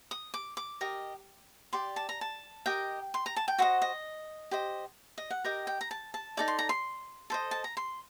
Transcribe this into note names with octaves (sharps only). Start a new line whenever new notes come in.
D#6
D6
D6
G4 A#4 D#5
G4 D5 C6
A5
A#5
A5
G4 A#4 D#5 G5
C6
A#5
A5
G5
F#4 C5 D#5 F#5
D#5
G4 C5 D#5
D#5
F#5
G4 A#4 D#5 G5
G5
A#5
A5
A5
D#4 A4 D5 D6
C6
A#5
C6
A4 C5 D#5
A5
A#5
C6